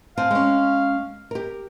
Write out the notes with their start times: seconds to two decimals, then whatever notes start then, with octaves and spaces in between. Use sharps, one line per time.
0.17 C4 F5 G#5 A5
0.31 G#3 C#4
1.31 G4 A#4